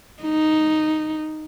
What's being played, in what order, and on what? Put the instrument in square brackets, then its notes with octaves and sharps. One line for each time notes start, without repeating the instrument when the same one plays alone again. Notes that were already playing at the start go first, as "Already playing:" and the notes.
[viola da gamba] D#4